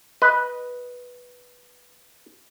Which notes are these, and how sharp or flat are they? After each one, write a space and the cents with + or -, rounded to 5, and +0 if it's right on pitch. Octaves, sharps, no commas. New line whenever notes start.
B4 -5 D#5 +0